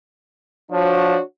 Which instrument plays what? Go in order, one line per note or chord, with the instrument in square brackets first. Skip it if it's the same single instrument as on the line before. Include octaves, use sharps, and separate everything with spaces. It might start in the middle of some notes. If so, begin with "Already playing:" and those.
[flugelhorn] F3 [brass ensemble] D4 F#4 C#5